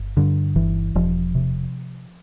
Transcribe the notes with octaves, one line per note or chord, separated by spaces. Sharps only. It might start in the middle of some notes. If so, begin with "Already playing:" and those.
Already playing: G1
G2 D3
G1 E3
E1 F3
C3